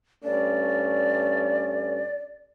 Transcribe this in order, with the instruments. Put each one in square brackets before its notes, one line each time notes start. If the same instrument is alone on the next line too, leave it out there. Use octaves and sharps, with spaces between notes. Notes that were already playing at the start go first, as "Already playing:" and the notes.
[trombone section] G2 A3 C#4 [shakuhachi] D5